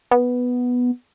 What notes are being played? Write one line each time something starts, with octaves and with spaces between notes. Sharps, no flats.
B3